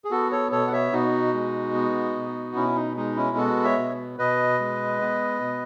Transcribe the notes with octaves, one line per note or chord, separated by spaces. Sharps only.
G#4
B3 F#4 A4
A4 C#5
B2 A4 C#5
F#5
C#5 E5
B2 D#4 F#4
G#3
B3
B2
B2 C#4 E4
D#4
G#3 D#4
C#4 E4
B3 F#4 A4
C#5 E5
B2
B2 B4 D#5
G#3
B3
B2